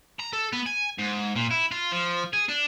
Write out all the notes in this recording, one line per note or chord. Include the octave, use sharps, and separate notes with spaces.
A#5
A4
B3
G#5
G#2
A#2
E4
F4
F3
G#4
D4